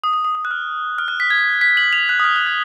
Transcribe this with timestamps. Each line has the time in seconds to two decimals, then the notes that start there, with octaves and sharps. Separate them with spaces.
0.04 D#6
0.14 D#6
0.24 D#6
0.35 D#6
0.45 F#6
0.51 F6
0.98 F6
1.08 F#6
1.20 B6
1.30 G#6
1.61 B6
1.77 F#7
1.93 F7
2.09 F#6
2.20 D#6
2.24 F6
2.36 F#6
2.47 G#6